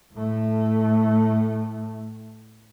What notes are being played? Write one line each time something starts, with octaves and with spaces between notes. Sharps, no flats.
A2 A3